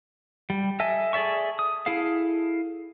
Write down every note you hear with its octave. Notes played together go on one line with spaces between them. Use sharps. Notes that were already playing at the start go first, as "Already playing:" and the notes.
G3
A4 D#5 E5 G#5 A5
G#4 A4 D5 E5 C#6
D#6
E4 G#4 A4 F5